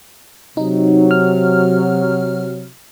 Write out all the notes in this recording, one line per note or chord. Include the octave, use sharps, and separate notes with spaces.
C3 F#3 D#4
F6